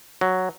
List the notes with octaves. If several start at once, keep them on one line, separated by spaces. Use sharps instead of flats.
F#3